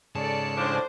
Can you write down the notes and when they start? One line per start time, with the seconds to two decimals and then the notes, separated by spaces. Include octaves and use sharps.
0.15 G#2 C#3 A4 D5 A5 C#7
0.57 A2 F3 D4 C5